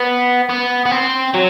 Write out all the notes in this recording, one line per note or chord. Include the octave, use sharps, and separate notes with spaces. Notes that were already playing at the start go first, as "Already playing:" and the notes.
Already playing: B3
B3
B3
C4
F#3